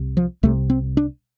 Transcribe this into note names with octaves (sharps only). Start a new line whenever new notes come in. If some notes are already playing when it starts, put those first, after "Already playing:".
Already playing: C2 C3
F3
C2 C3 A3
C4
D4